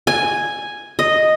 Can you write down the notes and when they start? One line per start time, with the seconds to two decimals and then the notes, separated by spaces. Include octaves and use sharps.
0.07 G#5
0.99 D#5